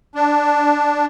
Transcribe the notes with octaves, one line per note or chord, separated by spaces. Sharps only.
D4